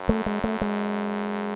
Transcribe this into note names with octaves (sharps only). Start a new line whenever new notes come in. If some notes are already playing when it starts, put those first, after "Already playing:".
Already playing: F#2
A3
G#3
A3
G#3